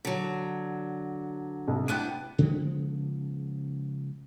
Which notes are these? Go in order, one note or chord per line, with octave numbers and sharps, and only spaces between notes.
D3 F#3
C2
B3 D4 E4 G5 F#6 D#7
C#3 F3 G#3 B3